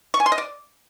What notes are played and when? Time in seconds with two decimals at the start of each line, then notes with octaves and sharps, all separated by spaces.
0.14 C#6
0.20 G#5
0.26 C6
0.32 D#5
0.38 D5